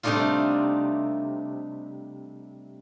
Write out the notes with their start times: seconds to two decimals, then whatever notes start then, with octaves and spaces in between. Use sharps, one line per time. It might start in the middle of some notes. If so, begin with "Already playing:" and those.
0.03 C3 G3 A3 D4 D#4 F4